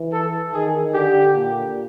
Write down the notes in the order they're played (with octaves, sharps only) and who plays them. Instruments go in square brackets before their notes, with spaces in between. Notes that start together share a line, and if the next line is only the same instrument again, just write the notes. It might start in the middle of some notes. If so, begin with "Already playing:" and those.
Already playing: [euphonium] E3
[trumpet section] A4
[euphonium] D#3 [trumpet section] G#4
[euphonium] D3 [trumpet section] G4
[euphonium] A#2